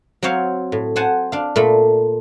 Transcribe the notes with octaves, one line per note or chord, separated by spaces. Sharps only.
F#3 C4 C5 C#5 F5
A2
C5 F#5 G#5 A5
D4 F5
A#2 A3 B5